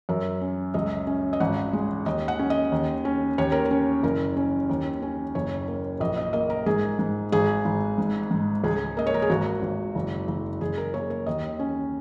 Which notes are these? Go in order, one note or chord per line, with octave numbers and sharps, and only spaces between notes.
F#2 A#4
C#4
C#2 D#5
C#4
D#5
G#1 F#5
G#3
D#2 D#5
F#5
C#4
D#5
D#2
C#4
D#2 C#5
A#4
C#5
C#4
F#1 A#4
C#4
D#2
C#4
F#1 C#5
A#3
A#1 D#5
D#5
A#3 D#5
A#4
G#2 G#4
G#2
G#1 G#4
G#1
G#2
G#2
C#2 G#4
A#3 D#5
C#5
A#4
G#4
G#1 F#4
G#1
F#1
F#1
F#1 G#4
A#4
A#3 C#5
C#5
D#2 D#5
C#4